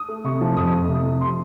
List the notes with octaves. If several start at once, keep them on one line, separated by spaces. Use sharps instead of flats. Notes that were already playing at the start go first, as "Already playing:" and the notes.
Already playing: D#6
A3
C3 C#6
F3
F2 D#6
A3
C3
F3
C6